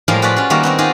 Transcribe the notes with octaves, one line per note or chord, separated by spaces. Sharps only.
A2 F3 G3 G#3 A#4 F5
G#3 F4 F#4 B4 D5 B5
C#4 F4
D#3 G3 A#3 D#4 F#4
B3 C4 F#4
D#4 F4 G4 G#4 D#5